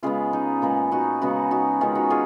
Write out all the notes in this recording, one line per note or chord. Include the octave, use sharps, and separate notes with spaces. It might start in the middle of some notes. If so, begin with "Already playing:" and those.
C#3 G#3 B3 C#4 F4
D#4
A#2 G#3 B3 D#4
D#4 F#4
C#3 G#3 B3 D#4 F#4
D#4 F#4
D#3 G#3 B3 C#4 F4
D#4 F#4
F4 G#4